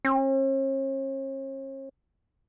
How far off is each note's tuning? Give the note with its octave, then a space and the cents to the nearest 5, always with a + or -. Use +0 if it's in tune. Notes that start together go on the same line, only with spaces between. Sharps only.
C#4 -45